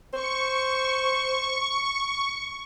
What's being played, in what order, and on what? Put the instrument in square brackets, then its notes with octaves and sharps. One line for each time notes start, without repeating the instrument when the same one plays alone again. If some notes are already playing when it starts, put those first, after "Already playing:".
[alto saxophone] C5 [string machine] C#6